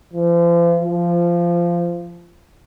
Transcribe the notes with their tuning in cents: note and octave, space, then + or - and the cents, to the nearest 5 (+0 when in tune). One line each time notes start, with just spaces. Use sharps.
F3 -40
F3 -15